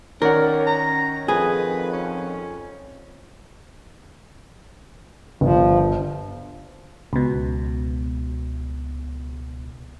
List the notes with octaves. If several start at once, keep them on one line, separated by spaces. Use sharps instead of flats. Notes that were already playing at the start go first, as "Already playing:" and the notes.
D#3 C#4 A#4 C#5 D5 F#5
A#5
F2 G#4 B4
C#4
G1 F3
C#2 B2